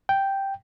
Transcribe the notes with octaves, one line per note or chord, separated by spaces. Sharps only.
G5